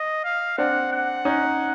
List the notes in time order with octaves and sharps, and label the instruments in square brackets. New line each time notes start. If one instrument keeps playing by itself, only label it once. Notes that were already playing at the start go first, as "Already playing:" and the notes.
Already playing: [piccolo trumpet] D#5
F5
[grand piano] C4 D4 [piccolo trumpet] F#5
[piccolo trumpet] F#5
[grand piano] C#4 D#4